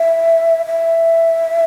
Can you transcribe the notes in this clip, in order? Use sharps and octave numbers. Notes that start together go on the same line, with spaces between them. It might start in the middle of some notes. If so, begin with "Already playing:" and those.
Already playing: E5
E5